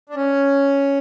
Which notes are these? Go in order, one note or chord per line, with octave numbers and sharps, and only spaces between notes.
D4
C#4